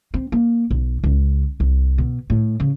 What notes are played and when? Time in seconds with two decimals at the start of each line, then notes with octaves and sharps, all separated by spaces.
0.14 C4
0.32 A#3
0.71 B1
1.03 C#2
1.60 C2
1.98 B2
2.30 A2
2.60 C#3